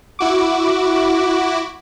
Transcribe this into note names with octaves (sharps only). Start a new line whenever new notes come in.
E4 F#4 D6